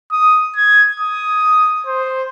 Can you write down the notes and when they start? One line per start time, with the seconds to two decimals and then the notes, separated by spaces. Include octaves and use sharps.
0.12 D#6
0.57 G#6
1.00 D#6
1.87 C5